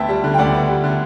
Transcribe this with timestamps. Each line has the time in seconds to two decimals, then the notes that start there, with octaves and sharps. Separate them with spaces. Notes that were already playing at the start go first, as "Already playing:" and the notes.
Already playing: D2 B3 E5 G5 A5
0.09 G3
0.24 D3
0.34 G5
0.38 D2 D5 F#5
0.54 B3
0.69 G3
0.84 D3